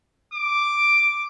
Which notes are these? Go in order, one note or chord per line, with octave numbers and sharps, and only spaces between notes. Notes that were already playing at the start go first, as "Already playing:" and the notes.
D6